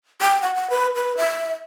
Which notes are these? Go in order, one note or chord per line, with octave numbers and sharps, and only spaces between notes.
G5
F#5
F#5
B4
B4
E5